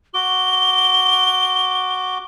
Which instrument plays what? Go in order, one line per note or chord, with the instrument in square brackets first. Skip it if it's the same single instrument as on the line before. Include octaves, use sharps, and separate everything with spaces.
[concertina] F#4 D6 [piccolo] G7